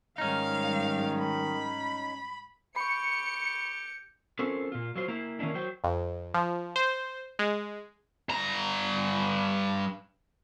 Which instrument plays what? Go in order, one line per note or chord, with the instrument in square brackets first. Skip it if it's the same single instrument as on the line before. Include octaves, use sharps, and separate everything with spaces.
[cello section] G#2 G3 [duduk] D#3 [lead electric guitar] C#4 D#4 [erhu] F5
[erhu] B5
[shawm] G4 [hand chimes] B5 C#6 [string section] C#7
[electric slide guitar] C4 C#4 F4 A4 A#4 C5
A#2 F4
F#3 F4 C5
A#3 E4
D#3 A#3 C#4 D4 E4
F#3 C5 G5
[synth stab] F2
F3
C5
G#3
[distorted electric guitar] G2 A#5